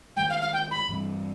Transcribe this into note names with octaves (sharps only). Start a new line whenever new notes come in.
F#2 D#3 G#3 G5
F5
F5
G5
B5
G2 E3 G3 C4